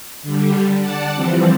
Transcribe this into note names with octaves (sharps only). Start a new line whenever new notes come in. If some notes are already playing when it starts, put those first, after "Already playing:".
D3 G3
D5 F#5 A5
E3 F3 G3 C4